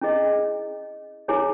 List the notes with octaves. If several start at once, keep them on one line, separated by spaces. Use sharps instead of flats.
C#4 E4 G#4 D#5
E4 G#4 C#5 G#5